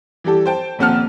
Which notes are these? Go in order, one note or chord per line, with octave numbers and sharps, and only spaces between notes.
E3 G3 G4 A4
C5 G5 A5
D#1 A#1 C4 F#5 A5 F6